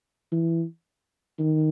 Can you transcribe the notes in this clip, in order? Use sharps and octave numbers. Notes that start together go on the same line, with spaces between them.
E3
D#3